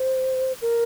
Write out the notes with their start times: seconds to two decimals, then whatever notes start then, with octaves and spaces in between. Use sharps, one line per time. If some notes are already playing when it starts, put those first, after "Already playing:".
Already playing: C5
0.61 A#4